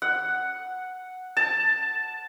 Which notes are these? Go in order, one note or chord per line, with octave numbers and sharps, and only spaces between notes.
F#5
A5